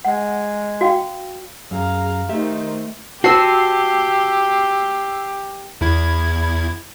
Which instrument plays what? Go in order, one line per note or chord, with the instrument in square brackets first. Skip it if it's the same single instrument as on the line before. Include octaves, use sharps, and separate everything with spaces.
[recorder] G#3 [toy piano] F#5
[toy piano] F#4 F5 G5
[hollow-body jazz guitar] F#2 [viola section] G#4 F5 A#5
[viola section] D#3 D#4 C5 [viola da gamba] A3 [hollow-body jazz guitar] G4 E5
[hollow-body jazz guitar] F#4 C5 [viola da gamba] G4 [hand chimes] A5 [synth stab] E6 C7
[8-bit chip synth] E2 E4 G#6